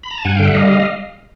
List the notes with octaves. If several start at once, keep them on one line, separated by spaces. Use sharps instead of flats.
B5
A#5
A5
G2 F#5 G#5
D3 F5 G5
E5 F#5
G3 D#5 F5